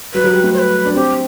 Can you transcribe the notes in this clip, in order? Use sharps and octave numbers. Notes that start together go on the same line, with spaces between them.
F#3 B4
F#3
G3
A3
C#5
B4
D4
C4 G4